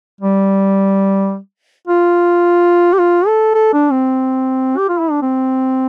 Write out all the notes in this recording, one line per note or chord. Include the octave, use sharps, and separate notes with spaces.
G3
F4
G4
F4
A4
A4
D4
C4
G4
F4
E4
D4
C4